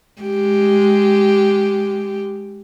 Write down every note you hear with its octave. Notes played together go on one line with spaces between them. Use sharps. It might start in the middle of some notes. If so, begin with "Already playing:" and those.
G#3 G4